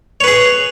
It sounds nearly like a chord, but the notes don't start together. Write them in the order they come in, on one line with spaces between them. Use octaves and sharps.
C#5 B4 G#4